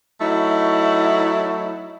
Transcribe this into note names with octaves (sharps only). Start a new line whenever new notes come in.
F#3 A3 D#4 E4